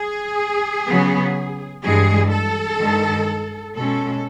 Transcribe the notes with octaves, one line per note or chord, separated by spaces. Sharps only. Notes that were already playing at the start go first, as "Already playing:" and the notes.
Already playing: G#4
C#3 F#3 B3
G2 E3 G#3 G#4
A4
G2 D#3 G#3
B2 G#3 C#4 A4